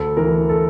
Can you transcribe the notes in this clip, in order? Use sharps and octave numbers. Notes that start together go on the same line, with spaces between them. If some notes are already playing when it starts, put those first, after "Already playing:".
Already playing: D2 A4
E3 A#4
A4